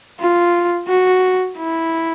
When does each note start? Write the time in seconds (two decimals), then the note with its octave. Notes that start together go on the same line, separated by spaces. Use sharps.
0.20 F4
0.88 F#4
1.57 E4